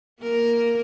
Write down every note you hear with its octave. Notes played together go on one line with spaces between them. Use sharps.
A#3 A#4